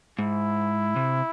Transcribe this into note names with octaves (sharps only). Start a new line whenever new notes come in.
G#2 E4
C3